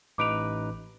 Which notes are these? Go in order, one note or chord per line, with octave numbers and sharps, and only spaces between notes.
A1 D#4 B4 D6 D7 F7